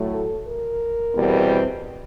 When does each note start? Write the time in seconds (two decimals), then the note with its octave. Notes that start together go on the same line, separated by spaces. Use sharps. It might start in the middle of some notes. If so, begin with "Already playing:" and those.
Already playing: A2 F#3 A3
0.12 A4
0.47 A#4
1.14 E2 B2 G3 C4